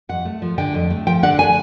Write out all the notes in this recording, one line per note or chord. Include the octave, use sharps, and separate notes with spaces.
F2 F#5
A3
F3
D3 G5
F2
A3
F3 G5
D3 F#5
G#5